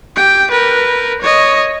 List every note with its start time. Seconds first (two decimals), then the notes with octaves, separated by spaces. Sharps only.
0.16 G4 G5
0.51 A#4 B4
1.22 C#5 D#5